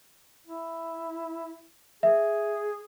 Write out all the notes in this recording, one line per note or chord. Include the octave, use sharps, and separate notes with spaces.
E4
G#4 E5